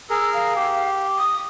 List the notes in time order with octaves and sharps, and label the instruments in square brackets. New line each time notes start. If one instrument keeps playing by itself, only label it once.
[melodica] G#4 A#4 [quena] E6
[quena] F5
[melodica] G4
[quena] D#6